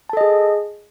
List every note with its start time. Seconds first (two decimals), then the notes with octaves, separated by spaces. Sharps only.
0.09 A5
0.13 A4
0.17 D#5
0.21 G#4